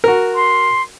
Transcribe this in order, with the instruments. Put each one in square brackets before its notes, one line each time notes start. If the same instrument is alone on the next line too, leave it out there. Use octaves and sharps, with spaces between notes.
[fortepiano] F#4 A#4
[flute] C6